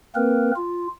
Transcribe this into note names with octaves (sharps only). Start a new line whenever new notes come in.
A#3 C4 A#4 B4
F4